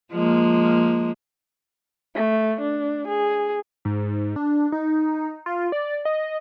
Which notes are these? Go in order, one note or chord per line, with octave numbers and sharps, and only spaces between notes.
F3 G#3 A#3
A3
D4
G#4
G#2
D4
D#4
F4
D5
D#5